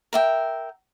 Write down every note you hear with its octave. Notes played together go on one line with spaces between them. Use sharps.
A#4 E5 G5